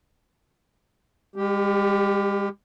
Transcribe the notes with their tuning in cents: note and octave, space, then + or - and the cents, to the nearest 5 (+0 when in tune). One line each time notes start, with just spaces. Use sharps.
G#3 -45 G4 +0